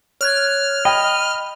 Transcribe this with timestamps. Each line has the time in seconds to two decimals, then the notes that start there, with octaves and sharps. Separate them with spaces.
0.21 C#5 F6 F#6 G#6
0.85 D#5 G5 B5